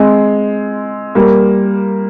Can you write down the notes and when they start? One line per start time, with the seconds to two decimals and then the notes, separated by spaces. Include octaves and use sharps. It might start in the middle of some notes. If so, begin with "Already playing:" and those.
Already playing: G#3 C4
1.15 G3 A#3